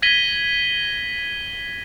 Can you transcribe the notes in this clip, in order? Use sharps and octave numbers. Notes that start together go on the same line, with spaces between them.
G#6 A#6 B6 D#7 F#7 G7